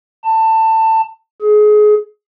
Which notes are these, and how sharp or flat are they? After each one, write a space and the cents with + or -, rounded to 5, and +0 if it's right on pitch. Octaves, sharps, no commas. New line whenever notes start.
A5 +20
G#4 +25